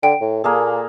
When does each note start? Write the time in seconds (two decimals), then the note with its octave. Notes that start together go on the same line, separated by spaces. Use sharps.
0.03 D3 G5
0.21 A2
0.44 A#2 A#3 G#4 A4